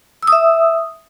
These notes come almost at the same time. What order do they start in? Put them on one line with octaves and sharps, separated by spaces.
E6 D#6 E5